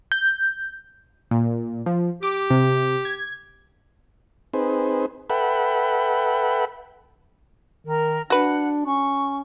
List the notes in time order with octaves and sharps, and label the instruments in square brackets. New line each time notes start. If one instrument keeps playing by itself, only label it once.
[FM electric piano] G6
[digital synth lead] A#2
F3
[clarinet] G4 [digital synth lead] D6
[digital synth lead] C3
G#6
[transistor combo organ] C4 D#4 G#4 B4 C5
A4 B4 E5 F#5 G5 B5
[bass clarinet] D#3 [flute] A#4
[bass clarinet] D4 [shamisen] F#4 B4 [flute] F#5
[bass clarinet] C#4 [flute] C#6